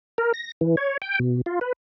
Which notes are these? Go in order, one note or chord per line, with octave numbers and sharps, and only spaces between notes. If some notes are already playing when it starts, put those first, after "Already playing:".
A#4
A#6
E3
C#5
G5
B2
F4
B4